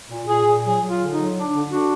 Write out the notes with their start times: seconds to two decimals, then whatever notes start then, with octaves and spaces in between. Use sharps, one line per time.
0.10 A#2
0.27 A#2 G#4
0.45 A#2
0.64 F#3 G#4
0.81 F#3
0.87 F4
0.99 D3
1.11 D#4
1.16 F#3
1.36 D4
1.53 D3
1.70 D4 F#4